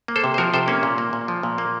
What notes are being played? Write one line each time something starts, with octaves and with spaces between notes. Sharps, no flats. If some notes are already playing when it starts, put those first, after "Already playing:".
A#3
A4 C5
C3
C5
F3 F#4 A#4
C3 A4 C5
A#3 C#4
A#2
A#3
A#2
F3
A#2
A#3